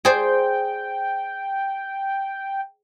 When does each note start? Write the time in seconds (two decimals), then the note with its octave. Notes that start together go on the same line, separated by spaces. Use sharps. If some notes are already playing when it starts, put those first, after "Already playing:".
0.05 G#4 C5 D5 G5